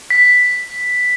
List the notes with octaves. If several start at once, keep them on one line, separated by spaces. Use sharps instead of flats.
B6